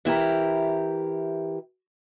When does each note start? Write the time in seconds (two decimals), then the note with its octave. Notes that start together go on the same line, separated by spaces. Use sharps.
0.05 E3 E4 G4 A#4